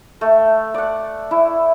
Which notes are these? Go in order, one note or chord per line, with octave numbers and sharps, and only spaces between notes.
A3
D5 F#5
E4